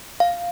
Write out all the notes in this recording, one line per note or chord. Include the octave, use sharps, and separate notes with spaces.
F5